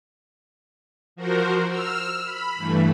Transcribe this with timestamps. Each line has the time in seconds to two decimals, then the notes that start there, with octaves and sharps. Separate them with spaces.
1.16 F3 F#4 A#4 C5
1.68 E6 F6
2.25 B5
2.56 G2 E3 A3